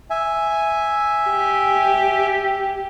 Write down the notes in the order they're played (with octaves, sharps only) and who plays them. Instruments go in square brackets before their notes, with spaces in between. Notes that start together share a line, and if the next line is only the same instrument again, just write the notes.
[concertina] E5 G#5
[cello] G4